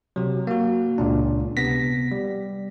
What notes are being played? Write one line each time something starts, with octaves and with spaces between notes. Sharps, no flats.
C3 F#3
A#3 F#4
C#2 A#2 D4
C3 B3 A#6 B6
G3